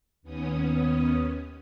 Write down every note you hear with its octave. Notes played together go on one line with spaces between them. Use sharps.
D#2 B3 C#4 D#6